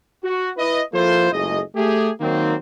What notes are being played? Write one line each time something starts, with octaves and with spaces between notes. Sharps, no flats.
F#4
E4 B4 D#5
F3 A#3 E4 F4 A4 C5
F#1 C#2 A3 G#4 D#5
A3 G4 G#4
D#3 F#3 A#3 C4